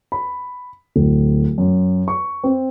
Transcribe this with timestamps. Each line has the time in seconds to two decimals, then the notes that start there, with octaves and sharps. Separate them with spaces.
0.12 B5
0.96 D1
1.58 F#2
2.08 C#6
2.44 C4